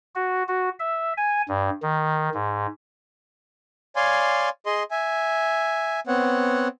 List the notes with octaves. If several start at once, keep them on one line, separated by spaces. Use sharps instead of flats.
F#4
F#4
E5
G#5
G2
D#3
G#2
C#5 D5 F5 G#5 C6
G#4 D#5 C6
E5 G#5
B3 C4 C#5 F#5